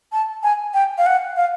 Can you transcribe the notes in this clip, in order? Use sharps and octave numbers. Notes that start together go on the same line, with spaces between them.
A5
G#5
G5
F5
F#5
F5